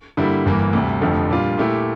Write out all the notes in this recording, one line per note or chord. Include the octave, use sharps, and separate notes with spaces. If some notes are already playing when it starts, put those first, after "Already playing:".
G2 D3 G3 A#3 E4
G1 G2 E3 A#3
D2 C3 G3
F1 F2 D3 F3 A3
A#2 G3 D4 F4
A#2 A3 E4 G4